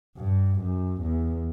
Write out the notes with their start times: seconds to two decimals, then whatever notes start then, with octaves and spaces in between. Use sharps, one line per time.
0.17 G2
0.60 F#2
1.01 E2